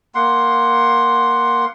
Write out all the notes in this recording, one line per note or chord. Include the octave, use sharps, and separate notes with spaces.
A#3 F#5 C6